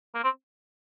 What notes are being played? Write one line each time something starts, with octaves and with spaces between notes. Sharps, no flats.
A#3
C4